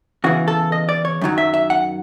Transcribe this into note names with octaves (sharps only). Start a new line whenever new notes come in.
E2 C#3 E3 F#4
A4
D#5
D5
C#5
F#2 D#3 F#3
E5
E5
F#5